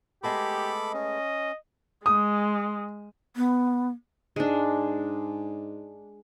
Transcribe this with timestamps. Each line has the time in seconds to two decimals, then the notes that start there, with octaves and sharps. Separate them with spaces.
0.23 G#3 A3 B3 G4 A4 B5 D6
0.94 C#4 D#5
2.06 G#3 D#6
3.36 B3
4.36 G#2 G#3 D4